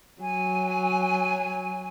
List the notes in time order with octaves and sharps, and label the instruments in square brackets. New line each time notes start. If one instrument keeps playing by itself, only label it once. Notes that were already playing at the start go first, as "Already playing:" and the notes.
[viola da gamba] F#3 [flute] G#5